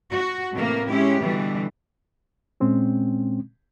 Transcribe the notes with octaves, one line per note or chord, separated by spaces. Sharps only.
F#4
A2 C3 E3 A3 A#3
G#3 C#4 E4 G4
B2 D3 E3 G3
A#2 G#3 C4 C#4